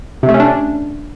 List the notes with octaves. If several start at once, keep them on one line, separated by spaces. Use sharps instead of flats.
C3
A3
C#4
D4